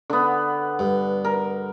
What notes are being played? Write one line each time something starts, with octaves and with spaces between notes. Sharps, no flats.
D3 B3
G2
A#4